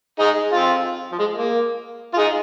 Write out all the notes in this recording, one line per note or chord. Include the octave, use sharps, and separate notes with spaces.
D#4 G#4
C4 F4
F3
G#3
A#3
F4
D#4 G#4